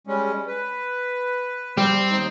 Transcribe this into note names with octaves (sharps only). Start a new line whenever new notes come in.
G3 G#3 C#4
B4
G3 C4
D#2 D#4 C5